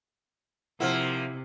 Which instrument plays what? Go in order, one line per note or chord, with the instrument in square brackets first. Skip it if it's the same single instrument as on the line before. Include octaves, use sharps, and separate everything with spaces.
[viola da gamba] C3 [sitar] F3 A#3 [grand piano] E4 F#5 F6